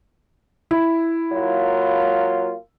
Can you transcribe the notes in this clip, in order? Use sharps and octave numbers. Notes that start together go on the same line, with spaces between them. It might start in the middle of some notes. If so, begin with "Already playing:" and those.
E4
F#3 A#3 F4